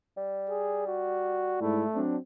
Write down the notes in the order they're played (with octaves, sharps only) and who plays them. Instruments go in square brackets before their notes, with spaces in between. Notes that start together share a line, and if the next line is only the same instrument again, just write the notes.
[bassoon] G3
[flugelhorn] G#4
F#4
[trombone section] G#2 E4 [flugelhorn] A3
[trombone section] F#3 C4 D4